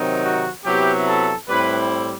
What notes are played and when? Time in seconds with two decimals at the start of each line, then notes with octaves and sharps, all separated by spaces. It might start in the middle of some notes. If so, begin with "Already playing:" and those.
Already playing: C3 D#3 F#3 C4 D#4
0.22 F#4
0.64 C3 F#3 B3 E4 G4
1.06 A4
1.48 A2 G3 C4 E4 B4